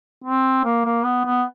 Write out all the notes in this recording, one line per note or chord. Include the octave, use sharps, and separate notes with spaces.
C4
A#3
A#3
B3
B3